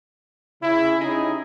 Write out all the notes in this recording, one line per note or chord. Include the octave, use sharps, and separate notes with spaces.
C#3 E4
C#4 D#4 E4 G4 G#4 D#5